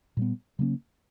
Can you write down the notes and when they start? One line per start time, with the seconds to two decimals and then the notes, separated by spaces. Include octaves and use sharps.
0.17 A#2 G3 B3
0.59 C#3 F#3 A#3 C#4